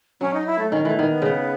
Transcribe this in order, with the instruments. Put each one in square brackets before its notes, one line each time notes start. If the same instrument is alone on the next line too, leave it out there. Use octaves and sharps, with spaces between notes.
[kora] F#3 [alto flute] C#4
[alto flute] D#4
E4
A3
[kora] D#3 [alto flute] C#4
[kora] E3 [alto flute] A3
[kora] D#3 [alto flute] B3
[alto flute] B3
[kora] C#3